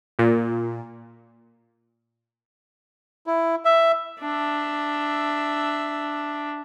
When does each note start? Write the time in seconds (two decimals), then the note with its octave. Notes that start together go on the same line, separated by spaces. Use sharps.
0.19 A#2
3.27 E4
3.65 E5
4.20 D4 E5